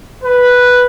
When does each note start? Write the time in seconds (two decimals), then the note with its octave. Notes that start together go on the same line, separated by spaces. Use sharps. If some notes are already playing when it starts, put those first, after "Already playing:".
0.23 B4